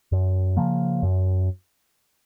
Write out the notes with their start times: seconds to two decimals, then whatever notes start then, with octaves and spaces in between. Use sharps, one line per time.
0.12 F#2
0.57 C#3 F3 A#3
1.03 F#2